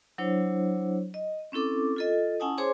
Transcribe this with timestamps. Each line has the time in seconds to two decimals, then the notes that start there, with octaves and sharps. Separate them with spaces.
0.18 F#3 D4 E4 C5 C#5
1.14 D#5
1.52 C4 C#4 E4 A4 D6
1.96 F4 A4 D#5
2.40 C#4 E4 F#5 G#5 A5 D#6
2.58 G#4 C5 C#5 G#5 C6 D6